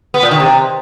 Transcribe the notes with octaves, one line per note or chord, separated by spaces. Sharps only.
B3
A#2
D#3
C3